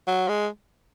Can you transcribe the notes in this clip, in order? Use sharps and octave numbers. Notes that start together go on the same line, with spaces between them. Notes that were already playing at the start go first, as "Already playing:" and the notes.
F#3
G#3